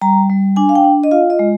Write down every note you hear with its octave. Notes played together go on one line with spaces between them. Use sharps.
G3 A#5
G3
D4 G#5
F5
G5
D4
D#5
F4 F5
D#5
G#3